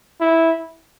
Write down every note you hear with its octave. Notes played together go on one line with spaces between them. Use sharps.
E4